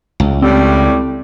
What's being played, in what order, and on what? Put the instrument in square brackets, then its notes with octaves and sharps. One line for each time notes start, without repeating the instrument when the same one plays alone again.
[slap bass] C#2
[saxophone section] A2 G3 [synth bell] C4